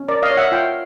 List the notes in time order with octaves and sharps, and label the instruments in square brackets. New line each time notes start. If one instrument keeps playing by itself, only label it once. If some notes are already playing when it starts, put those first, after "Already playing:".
Already playing: [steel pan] C#4
A#4 D5
D#5 F5
C#5
E5 F#5
F4 F5 G5